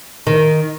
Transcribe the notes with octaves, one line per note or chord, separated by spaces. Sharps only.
D#3